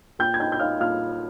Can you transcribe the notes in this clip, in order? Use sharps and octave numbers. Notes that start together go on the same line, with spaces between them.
A#2 G5 G6
G#6
D#4 G5 G6
G6
D#4 F5 F6
A#2 F5 F6